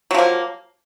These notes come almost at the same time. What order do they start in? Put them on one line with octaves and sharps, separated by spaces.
F#3 F3 A#3